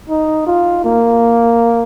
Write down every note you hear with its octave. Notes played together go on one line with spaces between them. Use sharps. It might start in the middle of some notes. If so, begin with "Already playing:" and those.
D#4
F4
A#3